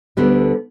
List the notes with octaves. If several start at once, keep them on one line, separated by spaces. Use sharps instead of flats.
D2 D3 G3 B3